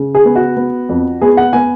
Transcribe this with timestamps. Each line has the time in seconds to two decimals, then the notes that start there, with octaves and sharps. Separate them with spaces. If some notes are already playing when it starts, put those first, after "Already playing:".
Already playing: C#3
0.15 G#4
0.25 B3
0.36 F#4
0.57 B3
0.89 F2
1.21 B3 G#4
1.37 F#5
1.53 B3 G#5